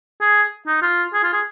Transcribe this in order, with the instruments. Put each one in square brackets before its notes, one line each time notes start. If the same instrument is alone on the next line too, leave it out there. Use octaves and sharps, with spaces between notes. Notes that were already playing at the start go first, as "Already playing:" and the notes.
[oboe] G#4
D#4
F4
G#4
F4
G#4